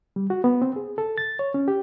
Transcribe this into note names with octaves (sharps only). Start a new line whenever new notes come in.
G3
F#4
B3
C4
G#4
A4
A6
C#5
C#4
G4